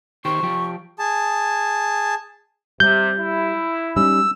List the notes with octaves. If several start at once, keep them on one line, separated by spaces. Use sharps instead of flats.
D#3 G4 C5 C#6
F3 G4
G#4 A5
C3 G3 G6
E4
G3 C#4 D#4 E6